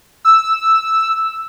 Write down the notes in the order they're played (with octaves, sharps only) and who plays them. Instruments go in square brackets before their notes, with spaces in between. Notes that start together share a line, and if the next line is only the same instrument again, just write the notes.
[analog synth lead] E6